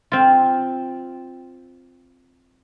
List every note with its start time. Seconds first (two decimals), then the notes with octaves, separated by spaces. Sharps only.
0.12 C4 F4